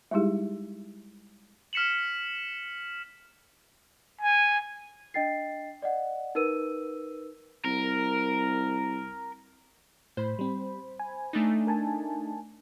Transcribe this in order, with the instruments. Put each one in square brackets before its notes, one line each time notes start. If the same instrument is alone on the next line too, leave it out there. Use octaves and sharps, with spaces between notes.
[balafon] G3 G#3 D#4 E4 G4 G#4
[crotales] F6 B6 C#7 E7 F#7
[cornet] G#5
[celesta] D4 D#5 G5 A6 C7
D5 D#5 F#5
D#4 A#4 B4 E6 D#7
[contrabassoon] C2 [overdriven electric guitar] A#4
[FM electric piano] A2 [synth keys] C5 B5
[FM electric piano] G3 C4
G#5
[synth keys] A3 D4 D#4
[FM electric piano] A#4 G#5 A5